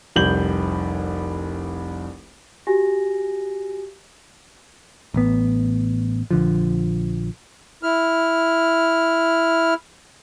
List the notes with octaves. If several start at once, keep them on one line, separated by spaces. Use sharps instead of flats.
F1 C2 G6 F#7
F#4 G4 G#5 A#6
A1 A2 B3
A#1 D3 F3
E4 F6